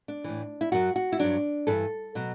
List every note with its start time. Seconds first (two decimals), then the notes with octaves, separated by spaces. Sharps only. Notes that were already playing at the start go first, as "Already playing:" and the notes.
0.08 D4
0.24 A2 E3
0.61 E4
0.72 F#2 F#3 F#4
0.96 F#4
1.12 E4
1.19 G2 F#3 D4
1.67 G2 E3 A4
2.15 B2 F#3